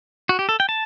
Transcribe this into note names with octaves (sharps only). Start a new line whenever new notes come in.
F#4
G4
A4
G5
A5